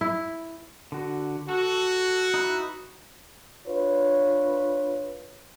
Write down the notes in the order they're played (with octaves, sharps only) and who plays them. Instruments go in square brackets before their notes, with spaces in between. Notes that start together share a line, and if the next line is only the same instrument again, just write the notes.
[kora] E4
[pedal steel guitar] D3 F#4
[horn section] F#4 [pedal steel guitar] A4
[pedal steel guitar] D#4 E4 B4
[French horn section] D4 F4 B4 C#5